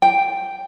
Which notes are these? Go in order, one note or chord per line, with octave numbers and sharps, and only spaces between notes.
G5